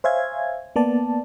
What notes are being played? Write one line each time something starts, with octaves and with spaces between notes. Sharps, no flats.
C5 C#5 E5 F5 G#5 G#6
A#3 B3 D5 A5